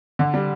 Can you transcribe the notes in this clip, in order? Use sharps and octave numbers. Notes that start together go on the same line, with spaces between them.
D3
G3